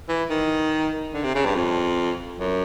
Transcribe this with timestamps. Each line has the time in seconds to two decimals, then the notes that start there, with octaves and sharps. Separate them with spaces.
0.09 E3
0.30 D#3
1.14 D3
1.23 C3
1.35 C#3
1.45 G2
1.55 F2
2.39 F#2